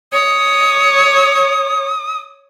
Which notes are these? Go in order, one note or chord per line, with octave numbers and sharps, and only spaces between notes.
C#5 D#6